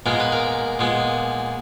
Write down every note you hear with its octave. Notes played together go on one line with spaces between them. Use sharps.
A#2 G#3 B3 A#4
B4
A#4
A#2 G#3 B3